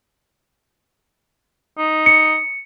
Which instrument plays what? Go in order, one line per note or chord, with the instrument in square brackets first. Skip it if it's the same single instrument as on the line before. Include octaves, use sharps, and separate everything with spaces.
[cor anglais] D#4
[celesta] C#7